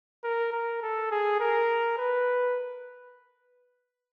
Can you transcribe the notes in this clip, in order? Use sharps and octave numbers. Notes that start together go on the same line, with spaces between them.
A#4
A#4
A4
G#4
A#4
B4